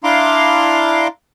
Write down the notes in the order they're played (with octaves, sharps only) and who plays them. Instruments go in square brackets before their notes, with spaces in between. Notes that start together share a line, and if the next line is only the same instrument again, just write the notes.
[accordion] D4 E4 F5 A#5 C6 D6